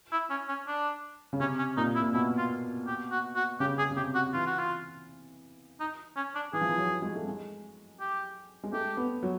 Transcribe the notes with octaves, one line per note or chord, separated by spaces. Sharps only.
E4
C#4
C#4
D4
C#3
C3 C#4
C#4
A#2 D#4
E4
A#2
B2 E4
F4
G4
F#4
F#4
C#3 G4
G#4
C#3
C3 G4
F#4
E3 F4
F#4
F4
D#4
C#4
D4
E3 G#4
F3
E3
F#3
G#3
A3
G#3
G4
G#3
A3 G4
B3
F#3